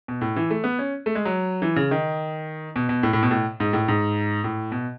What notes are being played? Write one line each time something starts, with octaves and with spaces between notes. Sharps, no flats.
B2
A2
E3
A3
B3
C#4
A3
G#3
F#3
E3
C#3
D#3
B2
B2
A2
A2
B2
A2
G#2
A2
G#2
A2
B2